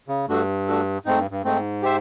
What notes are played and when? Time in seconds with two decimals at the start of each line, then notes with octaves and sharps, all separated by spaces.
0.08 C#3
0.29 G2 A3 D4 F#4 A4
0.67 A3 D4 F#4 A4
1.05 G#2 A3 C4 D#4
1.18 G2
1.31 G2
1.44 G#2 A3 C4 D#4
1.82 G4 C5 E5